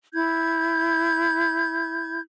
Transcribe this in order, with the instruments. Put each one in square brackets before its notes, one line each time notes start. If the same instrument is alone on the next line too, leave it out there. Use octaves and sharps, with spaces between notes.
[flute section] E4 G6 G#6